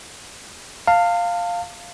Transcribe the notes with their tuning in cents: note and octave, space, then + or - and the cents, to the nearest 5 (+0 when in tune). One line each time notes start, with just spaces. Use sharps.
F5 +0 A5 +40